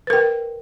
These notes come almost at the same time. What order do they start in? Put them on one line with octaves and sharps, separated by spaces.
B4 A#4 G5